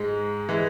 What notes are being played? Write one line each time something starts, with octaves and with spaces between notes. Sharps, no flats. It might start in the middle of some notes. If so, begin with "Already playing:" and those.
Already playing: G#2 G#3
E3 G#3